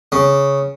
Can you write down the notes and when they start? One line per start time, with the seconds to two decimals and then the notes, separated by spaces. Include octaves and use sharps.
0.12 C#3